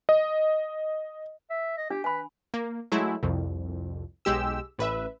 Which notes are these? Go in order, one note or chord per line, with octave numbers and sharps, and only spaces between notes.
D#5
E5
D#5
D4 G4
B4 G#5 B5
A#3
F#3 G#3 A3 E4
C2 F2
B1 G#3 G4 E6
A1 B4 E5